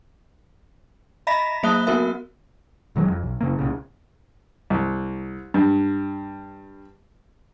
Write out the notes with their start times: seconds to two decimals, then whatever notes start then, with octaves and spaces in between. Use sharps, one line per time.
1.27 D#5 E5 A#5 B5 A#6 B6
1.63 F#3 A#3 E5 D#6 F#6 G7
1.87 B3 C4 F#4 A#4 E5
2.96 E1 D#3 F#3 G#3
3.08 F2
3.23 B1
3.41 F#1 C#3 A#3
3.59 C2 A#2 C#3
4.70 C2
5.54 G2